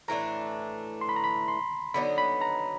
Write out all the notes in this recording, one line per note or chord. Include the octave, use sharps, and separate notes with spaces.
A2 E3 A3 D4 A#5
C6
B5
A#5
B5
C6
D3 F#3 B3 D#4 B5
B5
A#5